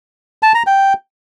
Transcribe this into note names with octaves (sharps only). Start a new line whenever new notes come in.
A5
A#5
G5